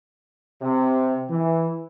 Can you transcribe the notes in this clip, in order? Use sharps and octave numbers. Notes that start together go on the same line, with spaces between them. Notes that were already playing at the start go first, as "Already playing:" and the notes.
C3
E3